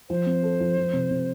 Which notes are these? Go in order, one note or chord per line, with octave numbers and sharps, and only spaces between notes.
F3 C5
C4
A4
F3
F3
C3
C3